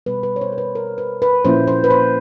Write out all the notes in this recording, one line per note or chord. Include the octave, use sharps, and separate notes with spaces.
B2 G3 B3 B4
B4
C#5
C5
A#4
B4
A#4
B4
B4
A#2 F3 A#3 C#4 E4 C5
C5
B4
C5